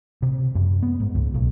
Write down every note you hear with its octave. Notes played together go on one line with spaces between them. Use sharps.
C3
F#2
B3
G#2
C#2
B1